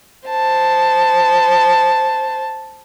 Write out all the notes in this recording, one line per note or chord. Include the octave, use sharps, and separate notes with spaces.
C5 A5